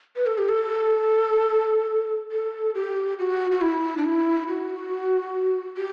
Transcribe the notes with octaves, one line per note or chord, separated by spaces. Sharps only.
B4
A4
G4
A4
A4
G4
F#4
F#4
E4
D4
E4
F#4
G4